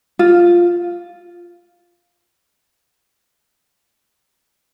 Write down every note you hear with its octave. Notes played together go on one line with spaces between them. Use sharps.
F4